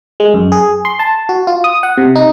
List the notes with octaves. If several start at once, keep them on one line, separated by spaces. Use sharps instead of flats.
G#3
F#2
G#4
C6
A5
F#4
F4
D#6
F#5
C3
D#4